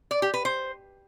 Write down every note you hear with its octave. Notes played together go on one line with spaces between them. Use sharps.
D5
G4
B4
C5